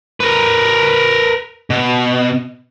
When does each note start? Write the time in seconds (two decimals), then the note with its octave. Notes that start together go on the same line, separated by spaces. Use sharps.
0.20 A#4 B4
1.70 B2